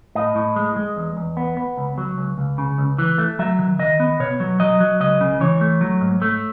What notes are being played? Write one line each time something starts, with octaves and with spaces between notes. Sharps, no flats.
A2 D#5
A2
G#3
G#3
E2
E2
B3
B3
C#2
F#3
C#2
C#2
C#3
C#2
E3
A3
F#3 E5
D#3
D#3 D#5
B3
B2 C#5
F#3
F#3 D#5
F#3
C#2 D#5
C#3
E3 C#5
A3
F#3
G#2
A3